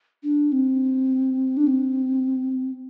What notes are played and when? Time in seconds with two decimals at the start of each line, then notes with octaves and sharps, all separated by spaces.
0.23 D4
0.52 C4
1.57 D4
1.67 C4